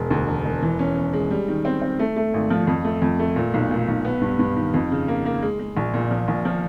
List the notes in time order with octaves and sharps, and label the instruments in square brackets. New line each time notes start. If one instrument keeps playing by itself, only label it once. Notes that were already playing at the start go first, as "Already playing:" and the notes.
Already playing: [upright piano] E1 G#3
D2
E1
E1
E3
C#4
C#4
G#3
G3
D#3
C4
C4
A3
A3
G#1
F3
F2
A3
F2
A3
A#2
B1
A#2
B1
B3
G2
G2
D#3
F2
C#3
A#3
A#3
G#3
G#3
A#1
A#2
F3
A#1
F3